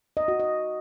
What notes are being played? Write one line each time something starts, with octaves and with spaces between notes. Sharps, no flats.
D#5
F#4
D#5